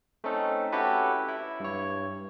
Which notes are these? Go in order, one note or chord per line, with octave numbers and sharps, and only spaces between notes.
A3 C4 C#4 D#4 A4
C#4 E4 F#4 G4 A4 B4
E4
G2 C#5